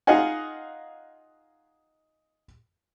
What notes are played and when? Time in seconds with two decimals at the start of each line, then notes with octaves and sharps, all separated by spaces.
0.07 D#4 F4 G#4 D#5 F#5 G#5